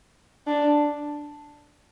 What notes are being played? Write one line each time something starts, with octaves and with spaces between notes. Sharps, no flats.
D4